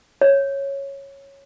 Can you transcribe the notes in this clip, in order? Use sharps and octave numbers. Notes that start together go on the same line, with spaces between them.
C#5